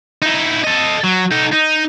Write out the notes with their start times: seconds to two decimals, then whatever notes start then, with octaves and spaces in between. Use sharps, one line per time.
0.22 D#4 E4
0.64 A4 D#5
1.04 F#3
1.31 D#4 A4
1.52 D#4